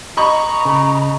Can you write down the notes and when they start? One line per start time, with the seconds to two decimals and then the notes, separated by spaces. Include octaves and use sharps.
0.17 D#5 A#5 B5 C#6
0.65 C#3